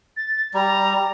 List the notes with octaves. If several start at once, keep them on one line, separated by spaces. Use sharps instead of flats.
A6
G3 A#5